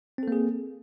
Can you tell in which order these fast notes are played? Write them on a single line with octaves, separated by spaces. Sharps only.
C4 A4 A#3 G#4